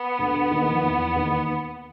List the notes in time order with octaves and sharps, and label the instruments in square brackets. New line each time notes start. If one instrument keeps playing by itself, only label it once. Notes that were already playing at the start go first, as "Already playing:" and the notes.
Already playing: [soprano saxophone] B3
[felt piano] D2 D3
D#2 D#3
F3
E2 E3
D#2 D#3